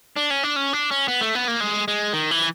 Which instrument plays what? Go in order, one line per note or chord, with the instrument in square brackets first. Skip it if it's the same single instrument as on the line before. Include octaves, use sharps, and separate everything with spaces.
[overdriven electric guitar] D4
C#4
D4
C#4
D4
C#4
B3
A3
B3
A#3
G#3
G#3
D#3
E3